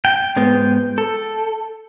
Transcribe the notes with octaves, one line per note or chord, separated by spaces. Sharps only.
G5
G#2 G#3 B3
A4